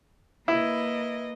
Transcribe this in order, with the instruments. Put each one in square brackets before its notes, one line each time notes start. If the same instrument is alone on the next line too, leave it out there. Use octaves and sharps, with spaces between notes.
[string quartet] A#3 B4 D#5 [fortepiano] E4